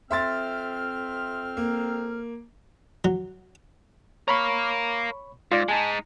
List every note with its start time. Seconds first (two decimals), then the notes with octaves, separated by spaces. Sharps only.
0.11 F2 C4 E5 C6 F6 A6
1.57 A#3
3.05 F#3
4.28 A#4 C#5 F5 B5 C#6
5.52 G#2 F4 D5
5.68 G#3 D#4 G#5 A5